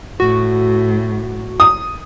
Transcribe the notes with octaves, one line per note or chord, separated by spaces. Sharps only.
A2 F#4
D#6